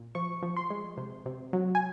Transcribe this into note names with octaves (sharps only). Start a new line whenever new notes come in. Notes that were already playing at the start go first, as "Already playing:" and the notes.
Already playing: A#2
F3 C#6
F3
C6
G#3
C3
C3
F#3
G#5